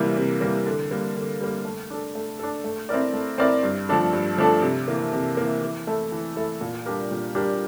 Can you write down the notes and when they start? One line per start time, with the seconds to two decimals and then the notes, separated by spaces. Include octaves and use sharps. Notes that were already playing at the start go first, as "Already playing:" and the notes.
Already playing: C3 E3 G3 A#3
0.17 C3
0.41 E3 G3 A#3
0.66 D3
0.91 G3 A#3
1.15 D3
1.41 G3 A#3
1.65 A3
1.90 D4 A4
2.15 A3
2.39 D4 A4
2.64 A3
2.89 C4 E4 A#4 D5
3.13 A3
3.38 C4 E4 A#4 D5
3.63 G2
3.89 F3 A3 D4 A4
4.13 G2
4.38 F3 A3 D4 A4
4.62 C3
4.88 E3 A#3
5.13 C3
5.37 E3 A#3
5.62 E3
5.87 A3 E4 A4
6.12 E3
6.36 A3 E4 A4
6.61 A#2
6.86 G3 D4 G4 A#4
7.11 A#2
7.35 G3 D4 G4 A#4